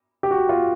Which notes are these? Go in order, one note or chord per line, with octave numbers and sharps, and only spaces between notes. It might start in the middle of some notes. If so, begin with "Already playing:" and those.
G4
F#4
F4